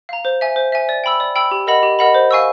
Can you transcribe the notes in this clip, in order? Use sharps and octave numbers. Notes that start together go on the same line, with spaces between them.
F5 A#5
C5
E5 G#5
C5
E5 G#5
D5
G5 B5 E6
D5
G5 B5 E6
G4
A#4 D#5 F#5 B5
G4
A#4 D#5 F#5 B5
C5
F5 G#5 C#6 E6